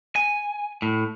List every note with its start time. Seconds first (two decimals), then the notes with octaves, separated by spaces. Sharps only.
0.16 G#5
0.82 A2